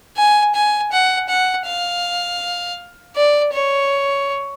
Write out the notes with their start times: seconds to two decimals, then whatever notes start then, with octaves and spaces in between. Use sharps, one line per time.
0.17 G#5
0.55 G#5
0.92 F#5
1.29 F#5
1.66 F5
3.16 D5
3.53 C#5